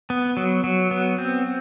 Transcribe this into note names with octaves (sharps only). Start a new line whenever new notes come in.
B3
F#3
F#3
B3
C4